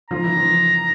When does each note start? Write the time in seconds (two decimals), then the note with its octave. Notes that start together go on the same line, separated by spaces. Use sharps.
0.10 F3 F4 A#5
0.24 E3 E4
0.37 F3 F4